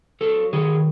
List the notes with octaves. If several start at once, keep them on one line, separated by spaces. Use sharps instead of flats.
F#3 A4
D#3 G#4